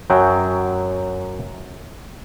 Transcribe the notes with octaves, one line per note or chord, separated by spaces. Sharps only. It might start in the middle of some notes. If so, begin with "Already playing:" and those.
F#2 F#3 G5